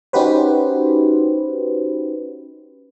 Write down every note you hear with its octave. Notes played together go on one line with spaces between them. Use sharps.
C#4 D#4 F#4 G4 B4 C5